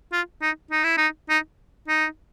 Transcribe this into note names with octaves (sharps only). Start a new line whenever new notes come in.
F4
D#4
D#4
E4
D#4
D#4
D#4